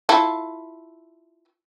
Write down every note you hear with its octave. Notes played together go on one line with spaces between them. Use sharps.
E4 F4 A4